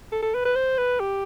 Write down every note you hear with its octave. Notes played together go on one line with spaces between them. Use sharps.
A4
A4
B4
B4
C5
B4
G4